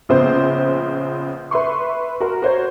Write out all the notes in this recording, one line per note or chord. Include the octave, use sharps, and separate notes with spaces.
A#1 C#3 B3 C5
B4 E5 C6 C#6
F#4 A#4
F#4 C5 C#5